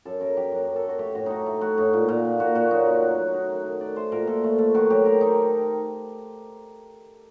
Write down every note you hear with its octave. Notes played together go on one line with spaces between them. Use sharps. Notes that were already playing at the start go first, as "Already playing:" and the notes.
F#2 A4
F#2 A#4
F#3 G4
F#2 F#4
F#2
A4
F#2
F#4
A3 G4
A2 F#4
A3 D#4 F#4
A3
A3 F#4
A2 D#4
A#2
A#2
A#3
A#2 F#4
A#2 F#4
F#3 D#4
F#2 D#4
A3
F#2
D#3 D#4
F#2
D#3
A3 D5
A3 C5
A#2 A#4
A#2 A4
A3
A3
D#3 F#4
F#3 G4
D#3 A#4
D#3 D#4